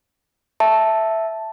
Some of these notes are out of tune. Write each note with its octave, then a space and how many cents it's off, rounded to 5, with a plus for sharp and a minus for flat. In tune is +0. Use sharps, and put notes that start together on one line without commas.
E5 +0 A5 +0